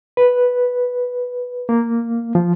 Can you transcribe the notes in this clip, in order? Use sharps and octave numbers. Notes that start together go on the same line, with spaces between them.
B4
A#3
F3